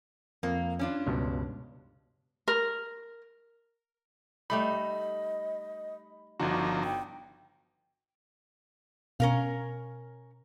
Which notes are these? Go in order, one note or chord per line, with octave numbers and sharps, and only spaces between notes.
F2 A#3
C#4 D4 F4
C#2 G2 B2
A#4
G3 A3 D#4 D#5 B5
G1 D3 F3 D#4 F#4 A#5
G5
B2 C#4 A#4 F5